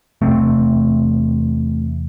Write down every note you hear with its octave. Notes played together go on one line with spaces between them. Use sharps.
E2 C3 A3 C4